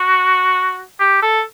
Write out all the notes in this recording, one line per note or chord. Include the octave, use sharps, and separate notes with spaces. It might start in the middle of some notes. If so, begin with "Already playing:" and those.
Already playing: F#4
G4
A4